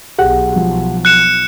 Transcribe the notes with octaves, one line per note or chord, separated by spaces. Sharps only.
B1 G4 G#4 F#5
F3
F#6 C#7 E7